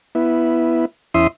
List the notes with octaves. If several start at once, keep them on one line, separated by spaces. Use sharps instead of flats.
B3 E4
E2 C#4 E4 E5 C6 D#6